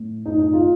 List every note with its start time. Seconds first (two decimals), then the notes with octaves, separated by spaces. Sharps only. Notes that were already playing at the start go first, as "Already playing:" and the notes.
Already playing: A2
0.26 D#4
0.39 D#4
0.53 F4